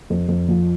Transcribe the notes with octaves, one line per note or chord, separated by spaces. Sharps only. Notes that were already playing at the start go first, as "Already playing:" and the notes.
F2
F2
F3